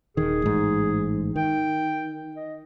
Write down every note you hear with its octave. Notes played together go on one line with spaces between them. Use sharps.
D#1 D#3 G#4
A1 G#2
D#3 G5
D#5